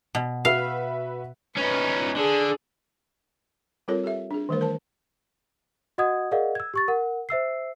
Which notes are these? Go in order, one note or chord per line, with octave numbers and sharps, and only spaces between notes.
B2
F#4 B4 E5 F5
C#4 D#4 B4
D3 G#4
G3 C4 F4 A4 A#4 C#5
G4 A4 E5
D4 G#4
D#3 E3 G3 A3 A#4 C5
A#4 C5 A5
F#4 D#5 F#5 D#6 G#6
G#4 A#4 D5 D#5 F5 F#5
E6 G#6
G4 C#6 A6
A#4 F#5
C5 E5 E6 C7